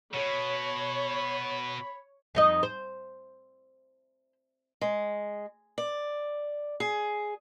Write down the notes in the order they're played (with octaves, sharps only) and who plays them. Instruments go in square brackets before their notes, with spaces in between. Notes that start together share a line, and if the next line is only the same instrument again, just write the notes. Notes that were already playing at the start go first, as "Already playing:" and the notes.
[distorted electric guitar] B2 [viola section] C#5 [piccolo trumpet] B5
[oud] F2 D#4 D#5
C5
[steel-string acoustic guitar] G#3
D5
G#4